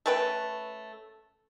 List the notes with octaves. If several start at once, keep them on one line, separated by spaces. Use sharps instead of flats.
A3 C#4 B4 G5